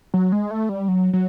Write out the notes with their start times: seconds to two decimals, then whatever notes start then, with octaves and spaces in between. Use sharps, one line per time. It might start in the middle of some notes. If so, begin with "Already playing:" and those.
0.14 F#3
0.32 G#3
0.51 A3
0.69 G3
0.88 F#3
1.13 F#3